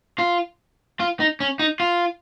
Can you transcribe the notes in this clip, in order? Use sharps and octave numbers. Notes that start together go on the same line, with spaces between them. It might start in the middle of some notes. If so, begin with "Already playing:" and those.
F4
F4
D#4
C#4
D#4
F4